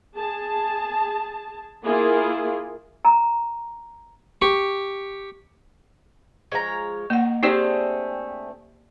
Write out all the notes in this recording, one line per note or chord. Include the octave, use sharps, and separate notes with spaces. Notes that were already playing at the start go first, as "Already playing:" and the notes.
G#4 A5
A#3 E4 F4 G#4
A#5
G4 C#6
F3 G#3 C#5 A#5
A#3 D#4 F#5
A3 C4 D4 D#4 G4 G#4 D5 G5